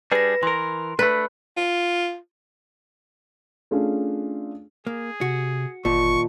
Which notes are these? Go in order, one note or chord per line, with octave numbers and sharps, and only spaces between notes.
G3 D4 G#4 B4 A#6
E3 A#4 C6
A3 D4 B4
F4
A3 C#4 D4 F4 G#4
A#3 G#4
C3 F#4
G1 D#2 A#2 F4 A5 C#6